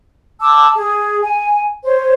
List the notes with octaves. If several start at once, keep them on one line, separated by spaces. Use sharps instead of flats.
A5 D6 E6
G#4
G#5
C5 C#5